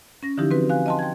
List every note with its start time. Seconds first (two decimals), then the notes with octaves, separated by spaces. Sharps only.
0.23 C#4 A#6
0.38 D3 E3 F3 D#4 E4 G4
0.51 C4 F#4 B4
0.69 F5 G#5 F#6
0.86 D#5 A5 C6
0.99 G5 G#6